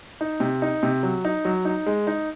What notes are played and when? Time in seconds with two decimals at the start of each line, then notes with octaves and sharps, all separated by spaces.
0.21 D#4
0.40 C3
0.62 D#4
0.83 C3
1.03 F#3
1.25 D#4
1.45 F#3
1.65 D#4
1.86 G#3
2.07 D#4